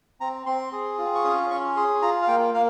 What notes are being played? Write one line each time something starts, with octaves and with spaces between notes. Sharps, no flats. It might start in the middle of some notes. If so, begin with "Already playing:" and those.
C4 A#5
C4 C6
G#4
F4
C#6
C#4 D#6
C#4 C#6
G#4 C6
F4 A#5
F5
A#3 G5
A#3 F5